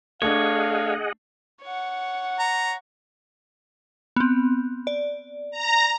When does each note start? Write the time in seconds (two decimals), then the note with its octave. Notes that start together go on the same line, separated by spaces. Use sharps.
0.22 A3 D4 G#4 C#5 D#5 F5 F#5
1.62 C#5 F#5
2.39 A#5
4.16 B3 C4
4.87 D5
5.51 A#5